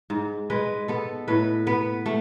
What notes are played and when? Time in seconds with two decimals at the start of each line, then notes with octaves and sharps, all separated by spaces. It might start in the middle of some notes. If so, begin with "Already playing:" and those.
0.10 G#2
0.50 G#3 B4
0.88 B3 A4
1.28 A2 B4
1.67 B3 B4
2.06 A3